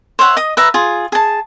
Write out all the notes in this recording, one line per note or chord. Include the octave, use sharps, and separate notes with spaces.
C5 C#5 E5 F#5
D#5 D#6
B4 E5 A#5
F4 G#4
G#4 A5